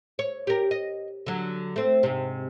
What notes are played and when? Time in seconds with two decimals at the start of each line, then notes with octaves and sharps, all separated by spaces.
0.19 C#5
0.47 G4 A#4
0.71 D#5
1.26 D3 F#3
1.76 A3 C4
2.03 G#2 C3